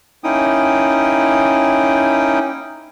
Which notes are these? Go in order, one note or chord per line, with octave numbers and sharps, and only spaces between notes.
A#3 C#4 D#4 E4 G5 D#6